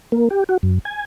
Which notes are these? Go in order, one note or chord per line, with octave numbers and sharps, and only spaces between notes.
A#3
G4
F#4
F#2
G#5